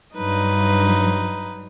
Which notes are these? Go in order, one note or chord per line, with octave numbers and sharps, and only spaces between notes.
G2 F#3 D#4 B4